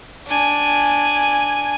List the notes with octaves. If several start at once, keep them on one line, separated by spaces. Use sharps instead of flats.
D4 G#5